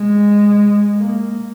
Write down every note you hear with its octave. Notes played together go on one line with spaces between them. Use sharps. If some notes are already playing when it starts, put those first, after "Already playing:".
Already playing: G#3
A#3